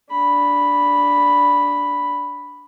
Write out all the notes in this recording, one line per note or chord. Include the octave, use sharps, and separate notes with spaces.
D4 B5